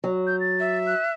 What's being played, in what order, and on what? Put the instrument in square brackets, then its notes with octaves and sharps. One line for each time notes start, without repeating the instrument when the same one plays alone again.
[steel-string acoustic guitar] F#3
[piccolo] G6
A6
[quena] E5
[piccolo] F#6